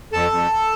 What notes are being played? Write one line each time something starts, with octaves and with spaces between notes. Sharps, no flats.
F2 A4 A5
F2